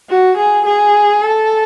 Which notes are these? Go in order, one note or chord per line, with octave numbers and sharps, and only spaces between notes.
F#4
G#4
G#4
A4